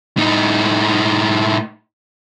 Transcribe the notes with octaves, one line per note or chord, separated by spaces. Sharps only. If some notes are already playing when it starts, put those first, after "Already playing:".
A2 D#4